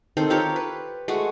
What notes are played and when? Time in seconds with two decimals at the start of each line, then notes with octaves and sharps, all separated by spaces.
0.17 D#3 C4 A4 C5
0.30 F4 G4 A#4 C#5
0.56 B4
1.08 G#3 A3 F#4